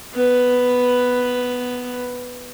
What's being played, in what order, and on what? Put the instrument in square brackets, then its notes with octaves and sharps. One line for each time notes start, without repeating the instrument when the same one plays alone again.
[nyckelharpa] B3 B4